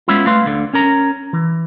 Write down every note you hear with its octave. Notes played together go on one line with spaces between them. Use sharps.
G#3 B3 C#4 E4 F4
A3 B4 F5 C6
D2 D3
C#4 A#4 A#5
E3